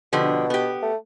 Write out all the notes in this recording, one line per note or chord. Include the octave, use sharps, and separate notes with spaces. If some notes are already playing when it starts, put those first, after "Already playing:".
B2 D3 F3 G4
B3 G4
A3